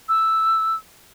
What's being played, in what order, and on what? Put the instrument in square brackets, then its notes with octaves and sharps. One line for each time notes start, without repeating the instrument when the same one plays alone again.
[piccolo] E6